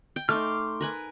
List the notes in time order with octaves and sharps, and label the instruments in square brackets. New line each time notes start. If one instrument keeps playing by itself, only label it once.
[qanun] G5
[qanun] A3 D#4 [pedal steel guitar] C6 D6 F6
[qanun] A#4 B4 G#5